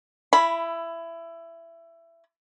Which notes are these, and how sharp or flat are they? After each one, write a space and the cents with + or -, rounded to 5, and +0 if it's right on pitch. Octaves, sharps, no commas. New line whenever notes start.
E4 +20 B5 +0